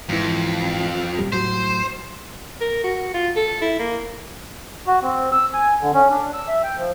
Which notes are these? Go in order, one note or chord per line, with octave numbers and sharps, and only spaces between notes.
F2 G#2 E3
D#1 G3
A2 F#3 C5
A#4
F#4
F4
A4
E4
A#3
F#4
C4
E6
G#5
D3
C#4
D4
E6
E5
G5
F3